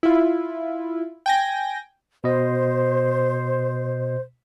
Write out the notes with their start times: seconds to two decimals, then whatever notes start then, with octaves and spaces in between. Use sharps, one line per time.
0.03 E4 F4
1.26 G5 G#5 A#6
2.24 B2 C5 D#5